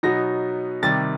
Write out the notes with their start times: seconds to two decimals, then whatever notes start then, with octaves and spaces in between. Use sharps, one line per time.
0.03 B2 F#3 B3 D#4 A#6
0.82 C3 D#3 G3 A6